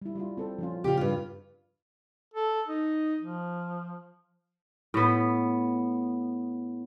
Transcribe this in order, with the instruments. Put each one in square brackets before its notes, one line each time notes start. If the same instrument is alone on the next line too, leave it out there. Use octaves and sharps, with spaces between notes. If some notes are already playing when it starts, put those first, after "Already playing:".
[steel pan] G3 E4
G3 E4 F4
C4 A4 C5
F3 C#4 F4
[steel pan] C#3 C#4 [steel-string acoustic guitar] F4 G4
[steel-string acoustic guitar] G2 F4
[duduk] A4
D#4
F3
[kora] A2 B3